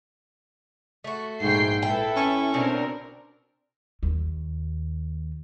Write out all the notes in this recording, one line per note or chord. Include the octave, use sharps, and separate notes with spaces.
A3 F#4
A#1 G#2 G5 C7
E4 A4 B4 G5
C#4
B2 C4 D4 A#4
D#2